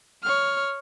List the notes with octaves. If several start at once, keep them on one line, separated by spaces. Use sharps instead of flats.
C#5 F6